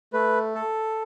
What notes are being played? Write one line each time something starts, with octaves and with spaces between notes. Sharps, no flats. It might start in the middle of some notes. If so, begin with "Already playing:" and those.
A3 B4
A4